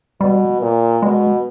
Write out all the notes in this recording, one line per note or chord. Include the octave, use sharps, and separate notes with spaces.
B2 G3
A#2
B2 G#3